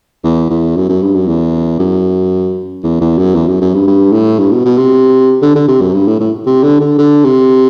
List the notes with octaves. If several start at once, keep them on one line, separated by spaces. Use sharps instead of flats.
E2
E2
F#2
F#2
G2
F#2
E2
F#2
E2
E2
F#2
E2
F#2
F#2
G2
G2
A2
G2
B2
B2
C3
D3
D3
C3
F#2
G2
A2
A2
C3
D3
D3
D3
C3